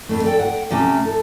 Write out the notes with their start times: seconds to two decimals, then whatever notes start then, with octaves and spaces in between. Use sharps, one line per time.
0.09 F2 A3
0.24 A4 D5 G5
0.39 F#5 G5
0.70 C3 A3 C#4 G4
1.05 A4